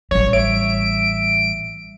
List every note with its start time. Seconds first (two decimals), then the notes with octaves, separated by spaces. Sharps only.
0.11 A1 G3 C#5
0.33 E5 D7